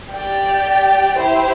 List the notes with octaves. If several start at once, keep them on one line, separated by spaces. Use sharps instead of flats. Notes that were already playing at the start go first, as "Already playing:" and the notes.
G4 D5 G5
E4 G4 C5